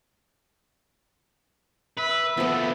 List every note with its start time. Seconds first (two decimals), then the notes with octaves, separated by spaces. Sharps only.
1.98 B4 E5
2.37 B2 F3 A3 B3